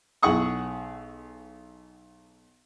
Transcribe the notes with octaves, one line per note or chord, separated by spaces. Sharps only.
B1 E4 G#4 F#5 C#6 D#6